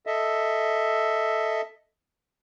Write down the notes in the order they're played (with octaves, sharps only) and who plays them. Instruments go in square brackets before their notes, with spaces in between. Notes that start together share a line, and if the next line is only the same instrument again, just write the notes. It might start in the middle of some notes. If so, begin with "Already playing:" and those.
[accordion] A4 D#5 E5